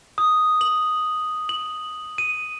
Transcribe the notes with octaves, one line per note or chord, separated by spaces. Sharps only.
D#6
F#7
F#7
D#7